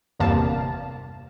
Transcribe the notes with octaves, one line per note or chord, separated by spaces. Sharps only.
G1 E2 G2 C3 A#3 A5